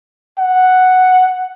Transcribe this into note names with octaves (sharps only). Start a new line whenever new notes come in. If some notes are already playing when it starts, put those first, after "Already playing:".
F#5